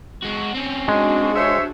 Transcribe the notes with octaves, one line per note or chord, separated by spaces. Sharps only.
G#3 F#4
C4 C#4
G#3 D4 F#4 G#4
C5 C#5 E5